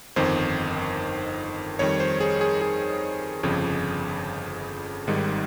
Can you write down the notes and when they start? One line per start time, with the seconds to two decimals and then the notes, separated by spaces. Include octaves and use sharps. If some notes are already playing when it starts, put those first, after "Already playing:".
0.16 G1 F2 D#3 C5
1.79 F2 D#3 G3 C#5
2.00 C5
2.20 G#4
2.41 G#4
2.62 G#4
3.43 G1 F2 C#3 F3
5.07 G#1 G#2 D#3 G3